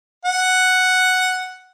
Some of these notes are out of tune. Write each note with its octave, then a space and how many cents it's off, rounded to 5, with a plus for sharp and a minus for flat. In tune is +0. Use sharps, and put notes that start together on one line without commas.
F#5 +0